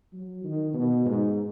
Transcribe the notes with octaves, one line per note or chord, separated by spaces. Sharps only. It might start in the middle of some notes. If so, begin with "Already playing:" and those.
F#3
D#3
B2
G#2